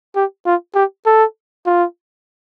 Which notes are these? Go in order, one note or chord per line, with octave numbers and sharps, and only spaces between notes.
G4
F4
G4
A4
F4